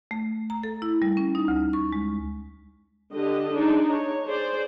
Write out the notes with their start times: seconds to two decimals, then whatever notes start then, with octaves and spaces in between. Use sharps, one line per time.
0.11 A3
0.50 A#5
0.63 A4
0.82 E4
1.02 G3
1.17 C#4
1.35 D#4
1.48 D2
1.73 C#6
1.93 G#3
3.14 D3 G4 D#5
3.55 D4 D#4 G#4 D5
3.89 C#5
4.27 G#4 C5 D5